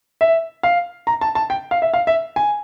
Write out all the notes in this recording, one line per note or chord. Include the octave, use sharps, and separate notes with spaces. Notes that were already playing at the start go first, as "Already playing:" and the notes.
E5
F5
A#5
A5
A5
G5
F5
E5
F5
E5
G#5